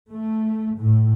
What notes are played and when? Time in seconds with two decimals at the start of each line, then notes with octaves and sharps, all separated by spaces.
0.12 A3
0.76 A2